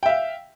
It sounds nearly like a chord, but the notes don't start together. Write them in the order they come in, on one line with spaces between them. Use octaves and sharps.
G5 E5 F5